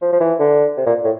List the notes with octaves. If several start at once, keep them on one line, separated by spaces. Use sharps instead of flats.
F3
F3
E3
D3
C3
A#2
A2